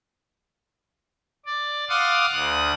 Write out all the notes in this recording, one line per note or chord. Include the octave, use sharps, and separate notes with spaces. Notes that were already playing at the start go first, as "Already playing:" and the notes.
D5
F5 F#5 C6 D6 D#6 F6
D2 D#6 F#6